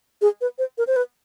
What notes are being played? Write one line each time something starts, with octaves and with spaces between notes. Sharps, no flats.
G#4
B4
C5
A#4
C5
B4